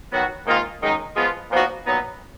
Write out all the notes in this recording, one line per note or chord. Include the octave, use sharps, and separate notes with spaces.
D#3 F#3 B3 F#4
G#2 D#3 A#3 F4
F#2 D#3 G#3 D#4
F3 G#3 B3 F4
A#2 F3 B3 D#4 F#4
A#2 F#3 B3 D#4